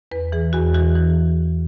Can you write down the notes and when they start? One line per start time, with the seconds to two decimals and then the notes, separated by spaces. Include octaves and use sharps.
0.11 E2 B4
0.32 E3 G#4
0.53 E2 F#4
0.74 E3 F#4
0.96 E3